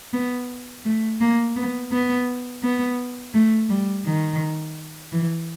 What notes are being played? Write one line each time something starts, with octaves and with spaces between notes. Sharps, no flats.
B3
A3
A#3
B3
B3
B3
A3
G3
D#3
E3